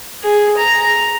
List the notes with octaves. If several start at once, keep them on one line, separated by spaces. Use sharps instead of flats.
G#4
A#5